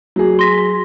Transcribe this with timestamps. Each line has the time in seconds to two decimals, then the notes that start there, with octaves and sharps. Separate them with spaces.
0.16 F#3 G#4
0.39 C6 A#6 B6